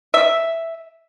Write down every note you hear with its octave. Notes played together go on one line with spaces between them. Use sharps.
E5